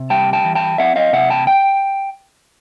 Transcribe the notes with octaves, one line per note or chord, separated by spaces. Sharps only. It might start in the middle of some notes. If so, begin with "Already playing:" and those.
Already playing: C3
G3 G5 A5
G5 A5
E3
G5 A5
C4 E5 F#5
D#5 F5
C3 E5 F#5
G5 A5
G5